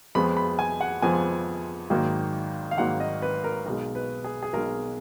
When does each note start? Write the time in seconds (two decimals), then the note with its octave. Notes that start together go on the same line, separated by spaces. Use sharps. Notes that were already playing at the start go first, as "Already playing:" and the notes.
0.15 F2 F3 G#3 B3 B5
0.37 B5
0.59 G#5
0.81 F#5
1.02 F2 F3 G#3 B3 G#5
1.90 G#1 G#2 D#3 F#3 A#3
2.71 F5
2.78 G#1 G#2 D#3 F#3 A#3 F#5
3.00 D#5
3.22 B4
3.44 A#4
3.66 B1 B2 G#3 A#4
3.95 B4
4.24 G#4
4.43 G#4
4.53 B1 B2 G#3 A#4